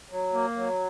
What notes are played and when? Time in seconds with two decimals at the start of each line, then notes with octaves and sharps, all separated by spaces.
0.11 F#3
0.34 A#3
0.56 F#3